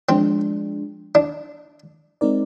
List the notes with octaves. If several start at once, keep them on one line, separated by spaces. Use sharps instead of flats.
F3 G#3 C4 D4
D4
G#3 C4 D#4 A#4 D5